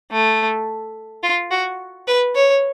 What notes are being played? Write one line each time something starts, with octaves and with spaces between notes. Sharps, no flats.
A3
F4
F#4
B4
C#5